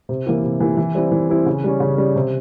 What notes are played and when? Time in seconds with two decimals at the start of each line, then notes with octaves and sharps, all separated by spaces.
0.09 C3
0.27 E3 A#3 E4 G4
0.43 C3
0.60 E3 A#3 E4 G4
0.77 E3
0.95 G3 C4 E4
1.12 E3
1.29 G3 C4 E4
1.46 C#3
1.64 G3 C#4
1.80 C#3
1.98 G3 C#4
2.16 C3